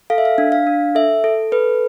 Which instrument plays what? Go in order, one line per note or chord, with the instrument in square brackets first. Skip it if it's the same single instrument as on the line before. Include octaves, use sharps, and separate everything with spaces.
[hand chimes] A4 F5
E5
F5
D4
F5
D4
A4 E5
A4
A4 B4